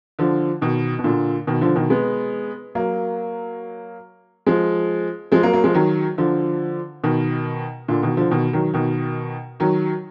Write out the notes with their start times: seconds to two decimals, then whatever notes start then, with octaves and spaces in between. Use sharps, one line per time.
0.19 D3 F3
0.61 B2 D#3
0.99 B2
1.04 A#2 D3
1.47 B2 D#3
1.61 D3 F3
1.76 B2 D#3
1.90 G#3 B3
2.75 F#3 A#3
4.46 F3 G#3
5.32 F3 G#3
5.43 F#3 A#3
5.53 F#3 A#3
5.64 F3 G#3
5.74 D#3 F#3
6.18 D3 F3
7.04 B2 D#3
7.88 A#2 D3
8.02 B2 D#3
8.17 D3 F3
8.31 B2 D#3
8.53 D#3 F#3
8.74 B2 D#3
9.60 D#3 F#3